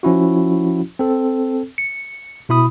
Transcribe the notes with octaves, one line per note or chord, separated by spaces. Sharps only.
F3 C#4 E4 F#4
C4 A4
C#7
B2 E4 B5 D#6